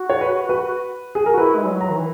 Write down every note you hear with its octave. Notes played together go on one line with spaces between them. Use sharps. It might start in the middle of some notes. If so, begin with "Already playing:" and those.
Already playing: F#4
C#5
B4
B4
G#4
A#4
F#4
E4 B4
G#3
F#3
A#5
D#3
E3